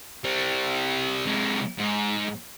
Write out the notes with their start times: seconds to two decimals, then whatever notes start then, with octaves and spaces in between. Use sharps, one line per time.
0.24 G3 C4
1.27 C3 G#3
1.79 G#2